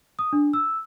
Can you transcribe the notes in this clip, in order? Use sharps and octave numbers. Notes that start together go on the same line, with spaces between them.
D#6
D4
E6